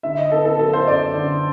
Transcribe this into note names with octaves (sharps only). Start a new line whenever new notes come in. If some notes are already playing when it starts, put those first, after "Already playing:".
D3 E5
D#5
B3 A4
A4
F#3 A4
C5
F#2 D5
D3